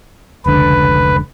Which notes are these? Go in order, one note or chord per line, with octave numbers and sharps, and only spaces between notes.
F1 C#2 D3 B4